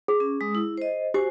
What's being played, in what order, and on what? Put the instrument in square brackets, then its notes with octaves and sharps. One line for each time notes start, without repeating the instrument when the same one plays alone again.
[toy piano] G#4
[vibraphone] C#4
G#3 D#6
E4
C5 D#5
[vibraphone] F#4 C5 G#5 [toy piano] G4